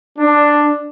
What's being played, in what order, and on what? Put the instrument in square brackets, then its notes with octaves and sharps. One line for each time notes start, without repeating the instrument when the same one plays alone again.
[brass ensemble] D4